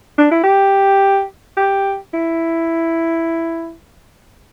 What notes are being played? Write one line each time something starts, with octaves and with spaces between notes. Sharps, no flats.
D4
E4
G4
G4
E4